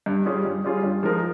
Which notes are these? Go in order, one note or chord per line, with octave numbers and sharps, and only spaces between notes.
G2
G3 C#4 F4 G#4
G2
G3 C#4 F4 G#4
G2
F3 G#3 D#4 A#4